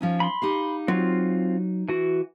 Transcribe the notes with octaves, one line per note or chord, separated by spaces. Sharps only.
F3 C#4 D#4
B5 C6
D#4 G4 F5
F#3 C4 F4
E3 F#4